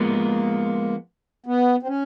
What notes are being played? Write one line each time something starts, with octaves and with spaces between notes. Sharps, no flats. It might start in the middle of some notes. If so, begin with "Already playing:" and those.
Already playing: F3 G#3 A#3 B3
B3
C4
C#4